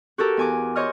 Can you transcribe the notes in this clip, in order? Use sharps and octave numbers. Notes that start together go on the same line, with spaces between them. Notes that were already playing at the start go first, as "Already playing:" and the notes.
F#4 G4 A4 A#4
E2 G#5 D6
C5 C#5 D#5 F6